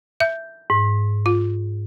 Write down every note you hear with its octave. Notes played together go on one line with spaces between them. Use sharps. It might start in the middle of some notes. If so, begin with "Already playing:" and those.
E5 G6
G#2
F4